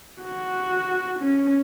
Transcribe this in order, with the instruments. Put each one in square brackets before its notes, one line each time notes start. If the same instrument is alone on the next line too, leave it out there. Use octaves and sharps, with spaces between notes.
[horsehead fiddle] F#4
C#4